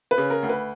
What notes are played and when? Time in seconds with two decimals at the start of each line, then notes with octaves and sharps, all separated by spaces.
0.11 B4
0.18 C#3
0.30 A#4
0.43 D2
0.49 B4